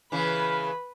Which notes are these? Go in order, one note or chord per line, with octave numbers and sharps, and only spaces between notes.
C#3 E3 B4 B5